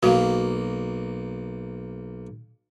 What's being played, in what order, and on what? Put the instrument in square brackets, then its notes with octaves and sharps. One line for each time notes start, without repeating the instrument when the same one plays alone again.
[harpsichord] B1 A#3 [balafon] F#4 F5